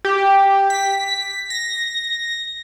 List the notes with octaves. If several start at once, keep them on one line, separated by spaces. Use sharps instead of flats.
G4
B6
A#6